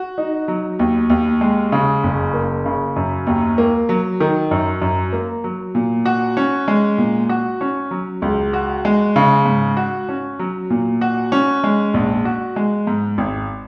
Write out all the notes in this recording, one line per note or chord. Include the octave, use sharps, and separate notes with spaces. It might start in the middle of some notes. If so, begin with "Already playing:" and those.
Already playing: F#4
D#4
F#3
D#2
D#2
G#3
C#3
F#1
A#3
C#3
F#2
D#2
A#3
F#3
D#3
F#2
F#2
A#3
F#3
A#2
F#4
C#4
G#3
A#2
F#4
C#4
F#3
C#2
F#4
G#3
C#3
G#2
F#4
C#4
F#3
A#2
F#4
C#4
G#3
A#1
F#4
G#3
G#2
G#1